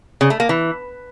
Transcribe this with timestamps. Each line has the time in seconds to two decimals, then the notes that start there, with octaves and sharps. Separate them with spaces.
0.21 C#3
0.30 A3
0.40 A#3
0.49 E3